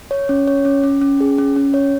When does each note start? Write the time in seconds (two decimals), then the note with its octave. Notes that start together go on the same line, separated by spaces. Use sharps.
0.11 C#5
0.29 C#4
0.48 C#5
0.65 C#4
0.84 C#4
1.01 C#4
1.20 G#4
1.38 C#4
1.56 C#4
1.74 C#5